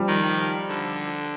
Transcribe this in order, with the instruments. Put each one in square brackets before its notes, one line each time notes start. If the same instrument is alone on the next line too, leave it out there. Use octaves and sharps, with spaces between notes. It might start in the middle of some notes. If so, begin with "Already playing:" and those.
Already playing: [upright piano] F3 G3
[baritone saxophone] D#3
D3